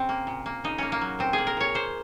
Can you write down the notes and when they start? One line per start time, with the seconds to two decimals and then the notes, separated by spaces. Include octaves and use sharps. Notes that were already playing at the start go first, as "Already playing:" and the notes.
Already playing: C#3 C4
0.09 A#3
0.27 A#2
0.46 A#3
0.64 C#3 D#4
0.78 A#3 C#4
0.92 A#3
1.01 F#3
1.19 A#2 C4
1.33 G#4
1.38 A#3
1.47 A#4
1.57 A#2 C#5
1.74 A#3 C5